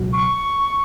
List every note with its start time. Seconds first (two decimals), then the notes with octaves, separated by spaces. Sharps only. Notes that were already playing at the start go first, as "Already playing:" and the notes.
Already playing: C#2 B2 F#3
0.13 C#6